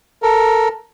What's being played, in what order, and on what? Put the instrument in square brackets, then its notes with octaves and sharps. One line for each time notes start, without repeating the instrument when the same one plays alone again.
[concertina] A4 A#4